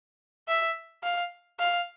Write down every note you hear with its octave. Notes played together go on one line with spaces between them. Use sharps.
E5
F5
F5